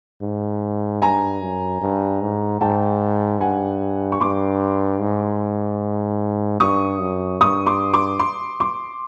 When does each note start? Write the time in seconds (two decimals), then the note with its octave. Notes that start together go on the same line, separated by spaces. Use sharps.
0.22 G#2
1.02 G2 G#5 A#5
1.42 F#2
1.81 G2
2.22 G#2
2.61 G#2 G5 A5
3.41 G2 F#5 G#5
4.12 C#6
4.20 G2 C6 D6
5.01 G#2
6.60 G2 C#6 D#6
7.00 F#2
7.40 G2 C#6 D#6
7.66 C6 D6
7.94 C6 D6
8.19 C6 D6
8.60 C6 D6